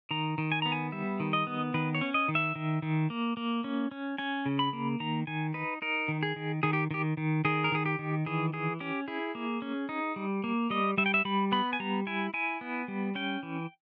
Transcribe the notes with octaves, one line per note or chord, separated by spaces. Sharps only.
D#3 A#5
D#3
G#5
B3 A#5
G#5
G3 E5
D#3
D#5
B3
D#3 B4
C#5
C#4
D#5
D#3
E5
D#3
D#3
A#3
A#3
C#4
C#4
C#4 G#5
C#3
B5
A#3
D#3 A#5
D#3 G#5
D#4 B4
D#4 A#4
D#3
G#4
D#3
D#3 G#4
G4
D#3 G4
D#3
D#3 G#4
A#4
D#3 G#4
G4
D#3
E3 G#4
E3 G#4
C#4 G4
E4 G#4
A#3
C#4
D#4
G3
A#3
G3 D#5
G3 E5
G5
E5
G3 B5
B3 B5
G#5
G3 A#5
E4 G#5
E4 G#5
B3
G3
C#4 G5
E3